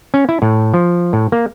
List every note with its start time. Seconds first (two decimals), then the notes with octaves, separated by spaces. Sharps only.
0.14 C#4
0.29 E4
0.42 A2
0.74 F3
1.13 A2
1.32 A#3